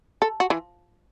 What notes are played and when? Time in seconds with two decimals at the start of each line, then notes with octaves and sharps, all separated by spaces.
0.22 A4
0.40 F#4
0.50 E3